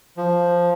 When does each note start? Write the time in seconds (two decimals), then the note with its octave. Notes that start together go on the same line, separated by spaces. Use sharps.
0.17 F3